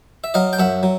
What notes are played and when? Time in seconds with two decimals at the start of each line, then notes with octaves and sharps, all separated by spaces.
0.24 E5
0.34 F#3 D#5 F5
0.53 G5
0.59 F#2 E5 F#5
0.83 F#3